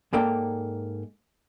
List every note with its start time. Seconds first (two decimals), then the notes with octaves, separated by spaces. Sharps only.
0.13 G#2 A#3 A4 D5 G5 A#5